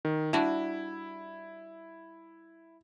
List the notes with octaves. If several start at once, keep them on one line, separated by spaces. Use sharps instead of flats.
D#3
G3 D4 E4 F#4